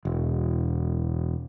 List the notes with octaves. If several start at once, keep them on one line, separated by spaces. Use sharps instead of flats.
E1